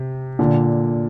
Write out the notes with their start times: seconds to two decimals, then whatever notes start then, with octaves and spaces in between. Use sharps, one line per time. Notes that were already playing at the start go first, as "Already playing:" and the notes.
Already playing: C3
0.39 A#2 D3